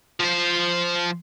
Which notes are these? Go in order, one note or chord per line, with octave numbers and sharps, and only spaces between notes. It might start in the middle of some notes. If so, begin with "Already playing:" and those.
F3 C5